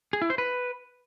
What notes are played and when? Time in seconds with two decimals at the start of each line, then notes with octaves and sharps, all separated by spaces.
0.13 G#4
0.22 E4
0.30 C5
0.38 B4